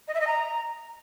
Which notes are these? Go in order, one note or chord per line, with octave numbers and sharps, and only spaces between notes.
D#5
E5
D#5
A#5